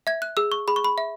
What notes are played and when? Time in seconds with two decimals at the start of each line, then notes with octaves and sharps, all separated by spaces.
0.07 E5 G#6
0.22 F#6
0.37 G#4 E6
0.52 C#6
0.68 G#4 B5
0.76 C#6
0.85 B5
0.98 E5